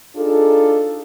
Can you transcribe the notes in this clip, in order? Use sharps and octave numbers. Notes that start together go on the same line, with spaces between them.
D4 D#4 F4 G#4 A4